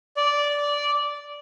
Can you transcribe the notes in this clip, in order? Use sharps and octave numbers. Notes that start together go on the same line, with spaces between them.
D5